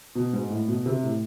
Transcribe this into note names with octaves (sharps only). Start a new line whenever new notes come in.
B2
G#2
A2
B2
C3
A2